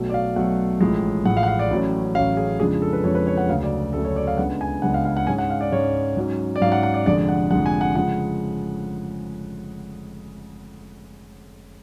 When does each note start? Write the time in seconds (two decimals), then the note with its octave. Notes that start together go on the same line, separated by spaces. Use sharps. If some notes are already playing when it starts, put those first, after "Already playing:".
Already playing: B1 B2 F#3 A3
0.10 D5
0.14 F5
0.36 B1 B2 F#3 A3 F#5
0.81 A1 A2 F3 G#3
1.25 A1 A2 F3 G#3 F#5
1.37 F5
1.43 F#5
1.48 F5
1.59 D5
1.71 A1 A2 F#3 C#4
2.15 A1 A2 F#3 C#4 F5
2.37 G#4
2.59 F2 C#3 F3 G#3 D4 G#4
2.82 A4
2.93 B4
3.04 F2 C#3 F3 G#3 D4 C#5
3.15 B4
3.27 C#5
3.37 F#5
3.49 D2 C#3 F#3 A3 F5
3.63 D5
3.93 D2 C#3 F#3 A3 A4
4.05 C#5
4.16 D5
4.27 F5
4.37 C#2 C#3 G#3 B3 D4 F#5
4.61 G#5
4.82 C#2 C#3 G#3 B3 D4 F#5
4.94 F5
5.05 F5
5.17 F#5
5.27 G#2 G#3 C#4 G#5
5.38 F#5
5.50 F5
5.61 D5
5.72 G#2 G#3 C#4 C#5
6.17 G#2 F#3 C#4
6.56 D5
6.62 G#2 F#3 C#4 F5
6.72 F#5
6.83 F#5
6.94 D5
7.06 F1 F2 D3 G#3 D4 D5
7.29 F#5
7.51 F1 F2 D3 G#3 D4 F#5
7.66 G#5
7.81 F#5
7.95 C#3 F3 G#3 F#5